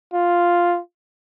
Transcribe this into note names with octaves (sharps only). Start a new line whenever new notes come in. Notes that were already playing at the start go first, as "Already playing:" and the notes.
F4